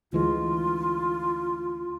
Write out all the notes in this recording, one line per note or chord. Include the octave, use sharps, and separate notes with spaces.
D2 E3 G#3 F4